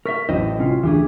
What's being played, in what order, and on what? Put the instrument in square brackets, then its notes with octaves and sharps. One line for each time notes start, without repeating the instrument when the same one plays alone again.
[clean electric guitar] A#4 E5 [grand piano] C#6 B6
[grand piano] A1 F#3 [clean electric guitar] E4 C5 D#5
[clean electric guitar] C2 C#4 F4
[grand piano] D2 [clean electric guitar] E3 G4 G#4